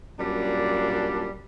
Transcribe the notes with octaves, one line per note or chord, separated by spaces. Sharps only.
F#2 A#2 G3 D4